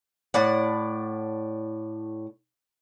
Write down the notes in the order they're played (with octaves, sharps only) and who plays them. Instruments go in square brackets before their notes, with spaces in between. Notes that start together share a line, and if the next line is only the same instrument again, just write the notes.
[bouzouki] A2 D5 F#5